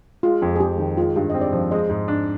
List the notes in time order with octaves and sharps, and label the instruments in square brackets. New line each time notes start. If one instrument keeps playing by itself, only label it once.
[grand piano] G#3 [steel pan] F4
[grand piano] F2
[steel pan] G#4
[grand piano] F2 [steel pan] G4
[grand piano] D#3
[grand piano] G#3 [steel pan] F4
[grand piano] G2 [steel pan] G4
[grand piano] C4 [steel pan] D#5
[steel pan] D5
[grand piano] F3 [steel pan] C5
[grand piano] G#3 [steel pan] C5 D#5
[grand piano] G#2
D4